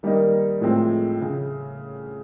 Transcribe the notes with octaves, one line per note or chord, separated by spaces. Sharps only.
D#3 G3 A#3 D#4
A2 F3 G#3 C4
C#3